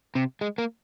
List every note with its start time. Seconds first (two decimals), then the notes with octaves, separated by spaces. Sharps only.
0.15 C3
0.41 G#3
0.58 A#3